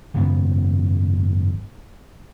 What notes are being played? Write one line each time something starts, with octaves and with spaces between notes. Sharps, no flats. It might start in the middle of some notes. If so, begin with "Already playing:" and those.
G#1 F#2 C#3 B3